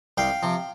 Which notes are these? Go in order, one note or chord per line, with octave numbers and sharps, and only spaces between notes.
C2 F5 G5
C3 F3